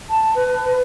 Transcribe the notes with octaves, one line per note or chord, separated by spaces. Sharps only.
A5
B4